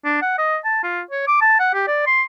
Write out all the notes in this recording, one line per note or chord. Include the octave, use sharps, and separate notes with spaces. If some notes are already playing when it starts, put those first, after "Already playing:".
D4
F#5
D#5
A5
F4
C#5
D6
A5
F#5
G4
D5
C6